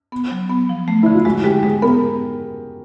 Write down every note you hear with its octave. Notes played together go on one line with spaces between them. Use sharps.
B3
F#3
B3
F3
A3
D3 E4
F4
G#3 F#4
G#3 G4
G#3 G#4
B3 A#4